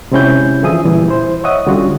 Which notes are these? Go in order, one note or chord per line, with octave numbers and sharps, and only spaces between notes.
C3 G#3 C4 C#4 E4 G6
D3 E3 F3 G#4 E5 D#6
A#2 E3 G3
E4 C5
C#5 D#5 E5 F#5 D#6
D3 G3 C#4 F4 F#4